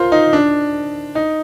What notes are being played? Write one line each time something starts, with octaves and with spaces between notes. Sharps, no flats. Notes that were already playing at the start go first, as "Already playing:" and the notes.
Already playing: F4 A#4 C5
D#4
D4
D#4